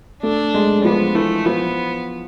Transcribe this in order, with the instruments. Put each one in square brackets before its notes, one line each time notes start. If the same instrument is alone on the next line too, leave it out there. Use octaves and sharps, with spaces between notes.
[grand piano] A3 [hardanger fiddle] D4
[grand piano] G#3
[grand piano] F3 [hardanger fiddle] B3
[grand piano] E3 [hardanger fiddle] A3
[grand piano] F3 [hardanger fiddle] B3